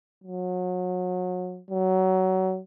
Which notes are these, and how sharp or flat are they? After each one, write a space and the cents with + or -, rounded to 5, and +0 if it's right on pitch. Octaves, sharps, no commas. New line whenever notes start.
F#3 -30
F#3 +20